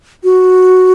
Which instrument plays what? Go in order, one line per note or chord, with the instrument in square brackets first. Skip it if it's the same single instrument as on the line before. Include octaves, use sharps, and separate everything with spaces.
[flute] F#4